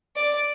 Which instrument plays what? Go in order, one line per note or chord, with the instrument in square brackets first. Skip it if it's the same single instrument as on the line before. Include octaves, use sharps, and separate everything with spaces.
[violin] D5